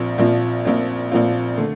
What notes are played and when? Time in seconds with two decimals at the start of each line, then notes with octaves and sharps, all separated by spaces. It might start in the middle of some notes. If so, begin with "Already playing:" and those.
Already playing: A#1 A#2 F3 C4 F4
0.18 A#1 A#2 F3 C4 F4
0.65 A#1 A#2 F3 C4 F4
1.11 A#1 A#2 F3 C4 F4
1.58 D3 A3